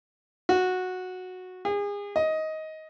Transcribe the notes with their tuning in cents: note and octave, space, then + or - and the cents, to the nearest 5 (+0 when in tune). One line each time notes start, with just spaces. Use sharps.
F#4 -10
G#4 -35
D#5 +15